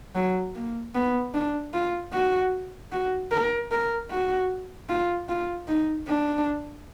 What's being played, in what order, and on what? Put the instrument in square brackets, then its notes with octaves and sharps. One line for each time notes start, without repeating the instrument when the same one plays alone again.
[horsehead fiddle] F#3
A#3
B3
D4
F4
F#4
F#4
A#4
A#4
F#4
F4
F4
D#4
D4